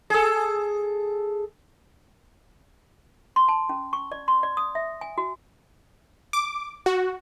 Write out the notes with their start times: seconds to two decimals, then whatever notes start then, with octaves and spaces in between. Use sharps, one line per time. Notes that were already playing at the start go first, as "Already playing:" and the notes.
0.10 G#4 A4
3.36 C6
3.48 A5
3.69 C#4
3.93 C#6
4.12 D5
4.28 C6
4.43 D5
4.57 D#6
4.75 E5
5.01 G#5
5.18 F#4
6.33 D6
6.86 F#4